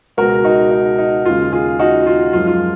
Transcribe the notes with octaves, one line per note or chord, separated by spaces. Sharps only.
C#2 B2 G#3 F#4 A#4
D#4 F#4
D#4
D#4
D#2 C#3 G#3 F4
F4 G#4
D#4 F#4
F4
F#2 F3 G#3 F4
F4